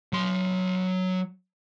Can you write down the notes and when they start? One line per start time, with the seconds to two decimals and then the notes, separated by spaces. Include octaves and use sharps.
0.13 F#3 C6